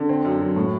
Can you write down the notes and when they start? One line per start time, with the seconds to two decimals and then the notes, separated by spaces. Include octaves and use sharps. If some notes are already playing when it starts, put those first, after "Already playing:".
Already playing: D3
0.09 C4
0.25 F#2
0.41 F#3
0.56 A2